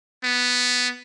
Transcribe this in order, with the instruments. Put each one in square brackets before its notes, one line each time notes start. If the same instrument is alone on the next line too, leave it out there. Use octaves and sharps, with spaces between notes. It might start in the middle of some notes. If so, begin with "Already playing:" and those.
[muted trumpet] B3